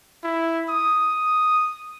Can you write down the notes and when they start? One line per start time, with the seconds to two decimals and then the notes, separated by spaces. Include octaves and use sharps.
0.24 E4
0.69 D#6